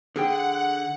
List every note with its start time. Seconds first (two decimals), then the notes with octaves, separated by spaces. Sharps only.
0.16 D3 G#4 F#5 G5